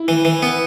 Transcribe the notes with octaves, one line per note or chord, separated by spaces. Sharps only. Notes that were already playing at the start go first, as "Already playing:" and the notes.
Already playing: E4
E3
E3
B3